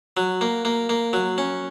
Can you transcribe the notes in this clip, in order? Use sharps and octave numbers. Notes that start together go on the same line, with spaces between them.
F#3
A#3
A#3
A#3
F#3
C#4